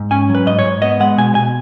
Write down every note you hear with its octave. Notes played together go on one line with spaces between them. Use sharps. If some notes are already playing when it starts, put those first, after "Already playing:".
Already playing: G#2
C#4 G#5
F#3
B4
G#2 D#5
C#5
G#2
B3 D#5
G#3 F#5
B2 G#5
B2 G#5